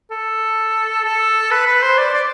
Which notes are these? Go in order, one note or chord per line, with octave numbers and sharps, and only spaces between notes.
A4
A4
B4
B4
C5
D5
D5